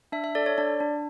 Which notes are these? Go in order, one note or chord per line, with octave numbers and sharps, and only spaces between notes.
D4 E5
E5
A4 D5
C#5
D4 D5
D4